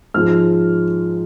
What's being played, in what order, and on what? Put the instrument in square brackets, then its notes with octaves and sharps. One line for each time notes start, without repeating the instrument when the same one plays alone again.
[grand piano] G#2 F3 G#3 F6